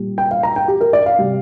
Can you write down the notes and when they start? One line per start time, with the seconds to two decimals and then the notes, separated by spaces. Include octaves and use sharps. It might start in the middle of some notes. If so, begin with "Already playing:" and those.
Already playing: A#2 G3
0.18 G5
0.31 F5
0.43 A#5
0.56 G5
0.68 G4
0.81 A#4
0.93 D5
1.06 F5
1.19 C3 G3